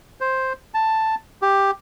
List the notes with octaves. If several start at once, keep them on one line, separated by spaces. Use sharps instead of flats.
C5
A5
G4